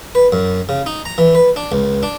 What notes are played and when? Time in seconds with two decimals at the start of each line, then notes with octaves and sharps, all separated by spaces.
0.15 B4
0.32 F#2
0.69 C#3
0.86 D#4
1.05 A#5
1.18 E3
1.35 B4
1.56 D4
1.72 C#2
2.03 D4